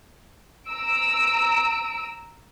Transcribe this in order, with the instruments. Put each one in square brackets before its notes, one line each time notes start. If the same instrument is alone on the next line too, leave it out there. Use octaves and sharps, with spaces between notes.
[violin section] A#5 E6 D7